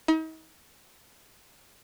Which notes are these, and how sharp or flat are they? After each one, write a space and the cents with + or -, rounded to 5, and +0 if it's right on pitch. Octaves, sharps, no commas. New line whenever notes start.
D#4 +40